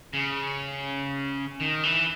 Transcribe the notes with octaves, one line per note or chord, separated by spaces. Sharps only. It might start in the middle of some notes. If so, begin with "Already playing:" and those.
C#3
D#3
E3